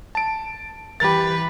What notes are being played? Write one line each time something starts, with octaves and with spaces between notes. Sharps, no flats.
A5 D7
E3 G4 B4 A6